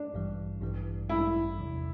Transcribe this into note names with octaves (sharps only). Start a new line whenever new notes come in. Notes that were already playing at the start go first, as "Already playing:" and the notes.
Already playing: D4
A1 G2 E3 G3
A1 G2 E3 G3
A1 G2 E3 G3 E4
E2 C3 F3